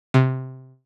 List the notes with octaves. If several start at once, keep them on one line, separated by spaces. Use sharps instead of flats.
C3